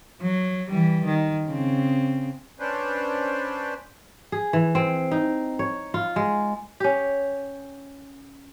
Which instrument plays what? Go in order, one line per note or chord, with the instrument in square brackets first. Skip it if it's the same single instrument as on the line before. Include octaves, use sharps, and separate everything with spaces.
[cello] F#3
E3 G3
D#3
C#3 C4
[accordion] C#4 D4 B4 C5
[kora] G#4
E3
C4
D#4
C#5
F4
G#3
C#4 G4